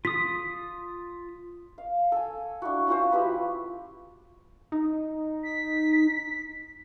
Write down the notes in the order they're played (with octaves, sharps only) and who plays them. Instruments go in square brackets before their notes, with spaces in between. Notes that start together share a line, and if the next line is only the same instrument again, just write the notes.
[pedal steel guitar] F4 D#6 [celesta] B6
[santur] F5
A4 G#5
D4 E4 F#4
C#4 F4 F#4 C5
F3 E4 G4 B4
[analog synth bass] D#4
[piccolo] B6